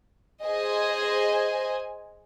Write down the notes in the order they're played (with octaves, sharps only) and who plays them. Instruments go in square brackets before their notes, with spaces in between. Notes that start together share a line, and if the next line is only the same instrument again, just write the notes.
[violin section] G#4 C5 D#5 G#5